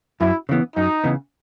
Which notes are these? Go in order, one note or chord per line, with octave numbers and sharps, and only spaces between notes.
F#2 E4
C#3 E3 B3
F#2 D#4
C#3 E3 B3